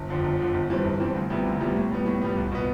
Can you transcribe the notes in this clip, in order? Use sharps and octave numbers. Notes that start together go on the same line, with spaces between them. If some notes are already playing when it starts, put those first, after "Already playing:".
Already playing: G1
F2 D3 F3
G1
F2 D3 F3
G1
G2 E3 G3 C4
G1
G2 E3 G3 C4
D2
C3 G3 B3 E4
D2
C3 G3 B3 E4
A2
G3 B3
A2
G3 B3
C2
B2 B3